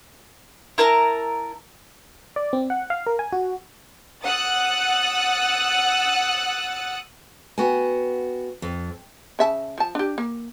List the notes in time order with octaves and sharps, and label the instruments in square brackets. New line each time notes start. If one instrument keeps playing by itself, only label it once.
[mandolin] E4 A#4 A5 A#5
[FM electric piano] D5
C4
F#5
F5
A#4
G#5
F#4
[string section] F#5 D#6 E6 F#6 A6
[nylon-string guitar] B3 F#4 G5 G#5
F2
[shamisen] C#3 E5 A5
F3 A5
D4 G4
A#3